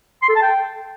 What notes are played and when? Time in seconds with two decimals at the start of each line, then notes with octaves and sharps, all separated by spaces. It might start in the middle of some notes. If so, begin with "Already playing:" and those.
0.22 C6
0.29 A4
0.36 A5
0.42 G5